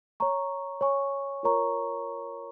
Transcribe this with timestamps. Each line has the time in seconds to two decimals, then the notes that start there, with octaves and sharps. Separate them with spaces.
0.20 C#5 A#5 C#6
0.81 C#5 G#5 C#6
1.43 F4 A#4 C#5 A#5 C#6